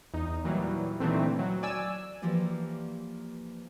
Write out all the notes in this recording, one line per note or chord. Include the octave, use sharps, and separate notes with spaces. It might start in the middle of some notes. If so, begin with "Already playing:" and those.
E2 D#4
A#2 E3 F#3 G3
D2 A#2 D#3 E3 A3 C4
F#3
D5 G#5 E6
E3 F3 A#3 G4 D5